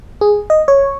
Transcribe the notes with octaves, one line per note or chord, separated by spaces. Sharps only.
G#4
D#5
C#5